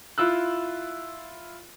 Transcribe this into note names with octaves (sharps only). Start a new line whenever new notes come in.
E4 F4 E6 F#6